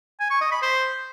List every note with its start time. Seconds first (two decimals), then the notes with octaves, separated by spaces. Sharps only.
0.20 G#5
0.30 C#6
0.41 D#5
0.52 B5
0.62 C5